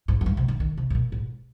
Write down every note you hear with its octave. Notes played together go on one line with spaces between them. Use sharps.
G#2
F2
G2
C3
D3
D#3
C3
G#2
A#2
G#2